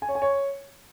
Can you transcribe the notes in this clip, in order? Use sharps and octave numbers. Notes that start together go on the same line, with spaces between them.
G#5
C#5
G#5
C#5